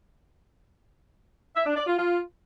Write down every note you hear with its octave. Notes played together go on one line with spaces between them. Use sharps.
E5
D4
D5
F4
F4